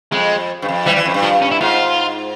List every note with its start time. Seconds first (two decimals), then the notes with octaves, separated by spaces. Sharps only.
0.12 F2 G#3
0.62 G2
0.68 F2
0.86 E3 G3
0.96 E3
1.06 F2
1.14 G2
1.23 F3
1.42 C#4
1.52 E4
1.61 G#2 F4